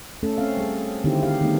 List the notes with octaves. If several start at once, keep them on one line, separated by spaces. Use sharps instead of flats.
A3 C#4 A4
C4 C#4 F5
G3 G#4
D3 D#3 C4 D#4 E4 G4
G4 G#4 F5
D#3 G3 A3 B3 D4 D#4